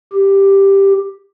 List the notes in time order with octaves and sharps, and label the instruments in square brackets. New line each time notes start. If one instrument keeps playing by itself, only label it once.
[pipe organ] G4